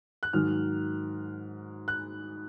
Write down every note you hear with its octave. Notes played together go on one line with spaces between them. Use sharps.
F#6
G#2 D#3 F#3 F6
F#6